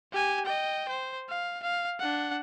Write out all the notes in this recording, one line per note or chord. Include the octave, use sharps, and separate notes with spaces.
G4 G#5
D#5 G5
C5
F5
F5
D4 F#5